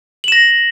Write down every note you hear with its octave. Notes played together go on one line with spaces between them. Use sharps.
A#6 E7 F#7